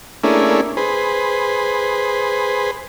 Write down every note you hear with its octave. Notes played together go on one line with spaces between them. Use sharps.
A3 A#3 C#4 D4 E4 G#4
G#4 B4 C5